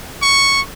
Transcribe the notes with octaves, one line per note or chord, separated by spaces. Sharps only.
C#6